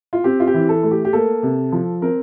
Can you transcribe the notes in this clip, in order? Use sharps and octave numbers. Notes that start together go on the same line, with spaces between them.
F4
C4 G4
F4
G4
E3
A4
A3
G4
G4
A#3 A4
C3
F3
C4 A#4